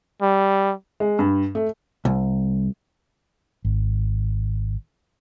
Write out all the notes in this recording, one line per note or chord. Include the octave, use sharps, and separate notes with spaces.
G3
G#3
G2
A3
C2
G#1